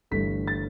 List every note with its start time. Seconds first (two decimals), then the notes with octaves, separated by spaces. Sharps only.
0.11 G1 G2 E3 A3 B6
0.48 A6